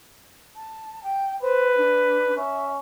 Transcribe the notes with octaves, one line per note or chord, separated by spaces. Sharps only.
A5
G5
B4 C5
D4
C#4 E5